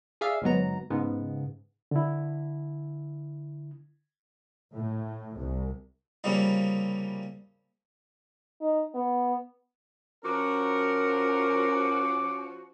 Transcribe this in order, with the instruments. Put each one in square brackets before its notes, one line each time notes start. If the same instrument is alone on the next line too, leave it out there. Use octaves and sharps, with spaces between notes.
[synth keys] G#4 D5 E5 F5
G1 G#2 F#3 B3 A#5
G#2 C#3 B3
[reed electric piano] D3 E4
[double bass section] A2
C2
[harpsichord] C2 C#3 F3 G3 A#3
[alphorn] D#4
B3
[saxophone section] F3 F#4 [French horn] C#4 [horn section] A#4 [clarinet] D6